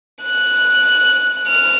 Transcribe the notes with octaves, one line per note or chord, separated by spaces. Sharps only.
F#6
F6